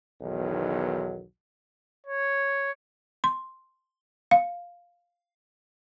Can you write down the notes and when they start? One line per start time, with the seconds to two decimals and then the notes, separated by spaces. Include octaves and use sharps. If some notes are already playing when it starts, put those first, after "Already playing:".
0.22 B1 E2 D#3 F#3
2.06 C#5
3.24 C6
4.31 F5